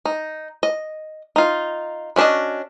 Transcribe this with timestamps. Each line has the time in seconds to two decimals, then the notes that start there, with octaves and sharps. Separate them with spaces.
0.05 D#4
0.63 D#5
1.36 D#4 F4
2.16 G#3 C#4 D4 F#4 D#5